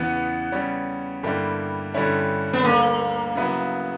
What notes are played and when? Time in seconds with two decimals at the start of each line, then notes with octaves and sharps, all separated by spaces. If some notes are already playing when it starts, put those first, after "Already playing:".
Already playing: E2 C#3 E3 B3
0.52 C#3 G3 C#4
1.23 G2 D3 G3 A#3 E4
1.94 G2 D3 G3 C#4 E4
2.53 B3
2.64 D2 D3 G3 A#3
3.35 C#3 F#3 B3 E4 B4